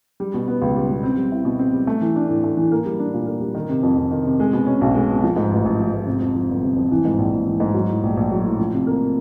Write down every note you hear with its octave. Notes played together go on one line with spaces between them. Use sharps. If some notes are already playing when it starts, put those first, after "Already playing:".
G3
B2
B3
C#2
G3
B2
C4
G3
E4
B2
C4
G3
A3
E3
D4
A2
A3
E3
A#3
G3
D4
A#2
A#3
G3
D#3
C3
F2
F2
D#3
C3
G#3
B2
C#4
B1
G#3
B2
F3
G#2
A1
A1
F3
G#2
C3
F2
F3
G1
C3
F2
E3
G#2
A#1
A#1
E3
G#2
F#3
A2
A#1
A#1
F#3
A2
F3
C3
A#3